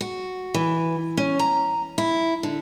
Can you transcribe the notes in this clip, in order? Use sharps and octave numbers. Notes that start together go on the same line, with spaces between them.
F#4
E3
C#4
A#5
E4
D3